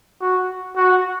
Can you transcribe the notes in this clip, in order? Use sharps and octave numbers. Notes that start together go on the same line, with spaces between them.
F#4
F#4